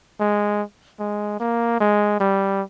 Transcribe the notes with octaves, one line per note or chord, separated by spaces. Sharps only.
G#3
G#3
A#3
G#3
G3